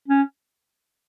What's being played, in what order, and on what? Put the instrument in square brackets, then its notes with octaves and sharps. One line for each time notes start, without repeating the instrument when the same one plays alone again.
[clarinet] C#4